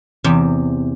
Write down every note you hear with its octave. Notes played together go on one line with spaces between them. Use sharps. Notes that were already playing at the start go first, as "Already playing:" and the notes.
E2 C3